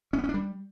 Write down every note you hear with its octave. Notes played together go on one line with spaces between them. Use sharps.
C#4
B3
C#4
D4
G3